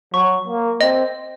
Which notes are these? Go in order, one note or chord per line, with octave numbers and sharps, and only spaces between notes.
F#3 C#6
A#3
C4 D#5